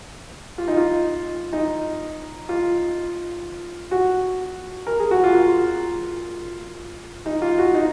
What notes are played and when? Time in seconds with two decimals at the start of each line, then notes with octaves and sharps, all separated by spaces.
0.58 F4
0.68 D#4
0.77 F4
1.53 D#4
2.49 F4
3.91 F#4
4.87 A#4
4.99 G#4
5.11 F#4
5.24 F4
5.35 F4
7.26 D#4
7.42 F4
7.58 F#4
7.74 D#4